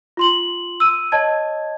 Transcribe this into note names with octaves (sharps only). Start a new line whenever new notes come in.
F4 C6 F#7
E6 D#7
C#5 D#5 A5 G#6